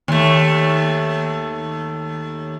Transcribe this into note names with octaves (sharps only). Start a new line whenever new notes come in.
D#2 A3